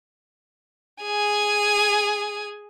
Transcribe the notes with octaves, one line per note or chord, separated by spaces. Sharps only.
G#4 G#5